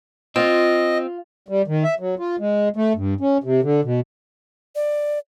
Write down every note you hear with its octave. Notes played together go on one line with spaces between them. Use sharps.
C4 F4 D#5
G3
D#3
E5
F#3
F4
G#3
A3
G2
C#4
C3
D3
B2
D5